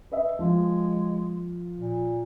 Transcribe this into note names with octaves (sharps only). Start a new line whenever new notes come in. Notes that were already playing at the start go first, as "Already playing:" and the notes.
B4 D#5 E5
F3 G#3
A#2